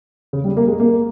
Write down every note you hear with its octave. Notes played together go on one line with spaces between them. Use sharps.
C#3
G3
A#3
G#3
A#3